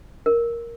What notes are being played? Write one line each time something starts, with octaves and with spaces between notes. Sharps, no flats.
A#4